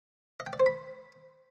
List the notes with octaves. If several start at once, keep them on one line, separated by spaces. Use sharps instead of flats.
D#5
G5
D5
C5
B5